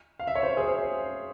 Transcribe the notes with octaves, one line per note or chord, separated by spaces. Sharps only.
F5
E5
C#5
C5 E5
G#4 C5